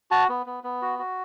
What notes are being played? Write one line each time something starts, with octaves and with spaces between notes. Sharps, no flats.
F#4 A5
B3
B3
B3
F#4
F#4